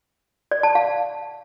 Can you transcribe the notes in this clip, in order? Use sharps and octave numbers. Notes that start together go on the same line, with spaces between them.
D5
A5
F5